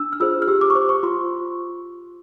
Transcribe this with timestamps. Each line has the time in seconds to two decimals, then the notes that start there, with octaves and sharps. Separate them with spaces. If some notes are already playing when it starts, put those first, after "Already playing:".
Already playing: D4 E6
0.13 F6
0.20 F4 G#4 C5 E6
0.42 F6
0.48 G4 E6
0.61 D6
0.70 C#6
0.75 C5 D6
0.89 C#6
1.03 F4 C6